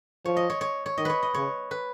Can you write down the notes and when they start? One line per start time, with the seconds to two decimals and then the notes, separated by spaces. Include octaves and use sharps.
0.25 F3 C#5
0.37 D#5
0.50 C#5
0.61 C#5
0.86 C#5
0.98 D#3 D#5
1.05 B4 C#5
1.23 D#5
1.34 C#3 C#5
1.71 B4